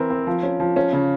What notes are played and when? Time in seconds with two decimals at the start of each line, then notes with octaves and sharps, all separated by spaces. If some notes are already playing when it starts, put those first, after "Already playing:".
Already playing: E3 C4 A#4
0.10 C4
0.27 F3
0.43 C#4
0.60 F3
0.76 C#4
0.93 C#3